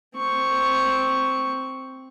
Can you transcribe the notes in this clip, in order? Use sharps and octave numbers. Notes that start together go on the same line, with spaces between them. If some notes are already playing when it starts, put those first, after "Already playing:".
C4 C#6